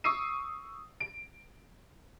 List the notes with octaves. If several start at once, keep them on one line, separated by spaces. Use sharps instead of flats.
C#6 D#6 E6 C7 D#7
D7